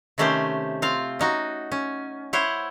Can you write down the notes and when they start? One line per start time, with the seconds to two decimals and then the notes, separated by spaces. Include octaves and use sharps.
0.18 C3 D#3 A3 C#4 G4 C5
0.82 C4 F4 F5
1.19 C#4 D#4 F#4
1.72 C#4
2.33 E4 C5 C#5 F#5